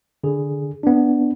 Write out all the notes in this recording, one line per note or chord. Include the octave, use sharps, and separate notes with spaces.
D3 G#4
B3 D4